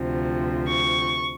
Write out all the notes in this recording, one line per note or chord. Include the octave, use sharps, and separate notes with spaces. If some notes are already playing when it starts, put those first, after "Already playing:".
Already playing: D2 C3 F3
C#6